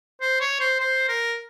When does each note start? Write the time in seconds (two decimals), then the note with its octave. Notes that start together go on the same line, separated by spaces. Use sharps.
0.21 C5
0.41 C#5
0.60 C5
0.79 C5
1.08 A#4